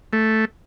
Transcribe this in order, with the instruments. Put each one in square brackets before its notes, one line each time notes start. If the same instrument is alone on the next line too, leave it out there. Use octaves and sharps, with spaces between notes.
[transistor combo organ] A3